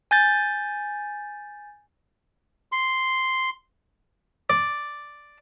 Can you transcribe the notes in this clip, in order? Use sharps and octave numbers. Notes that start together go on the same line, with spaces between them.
G#5 G6 A6
C6
D5